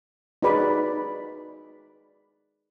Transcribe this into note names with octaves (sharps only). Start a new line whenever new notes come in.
D#4 F#4 G#4 B4 D5 B5